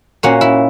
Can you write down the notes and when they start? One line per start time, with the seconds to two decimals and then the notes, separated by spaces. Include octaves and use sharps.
0.23 A#2 A#3 C#4 F#4
0.41 E4